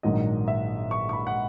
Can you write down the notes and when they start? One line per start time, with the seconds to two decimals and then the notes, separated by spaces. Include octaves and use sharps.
0.03 A#1 G#2 D#3 F#3 D#5
0.48 E5
0.91 C#6
1.09 C#6
1.13 B5
1.27 F#5